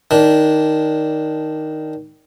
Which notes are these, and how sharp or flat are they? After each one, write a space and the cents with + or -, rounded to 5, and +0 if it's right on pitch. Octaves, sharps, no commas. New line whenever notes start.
D#3 +0 D4 -15